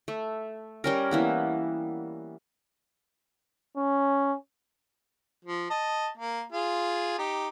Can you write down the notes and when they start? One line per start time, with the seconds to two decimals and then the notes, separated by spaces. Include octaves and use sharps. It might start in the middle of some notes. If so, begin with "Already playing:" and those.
0.08 A3
0.84 G3 C#4 A#4
1.11 E3 A#3 B3
3.77 C#4
5.45 F3
5.70 D#5 A5
6.17 A#3
6.52 F4 G#4
7.18 D#4 G4